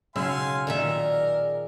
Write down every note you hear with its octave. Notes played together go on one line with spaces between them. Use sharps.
B1 C#3 F5 G#5 C6 E6
A#2 D#3 G#4 A#4 D5 E5